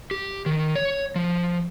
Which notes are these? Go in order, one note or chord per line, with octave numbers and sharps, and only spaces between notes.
G4
D#3
C#5
F3